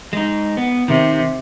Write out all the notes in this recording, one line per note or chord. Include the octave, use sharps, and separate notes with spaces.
G#3 D#4
B3
C3 D#3